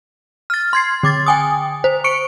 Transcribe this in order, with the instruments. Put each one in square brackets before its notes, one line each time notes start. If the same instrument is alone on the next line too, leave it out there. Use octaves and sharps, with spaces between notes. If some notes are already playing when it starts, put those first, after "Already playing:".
[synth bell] F6 A6
C6 G#6 C7
D3 D6 A6
G5 G#5 D#6
C5
C#6 C#7 D7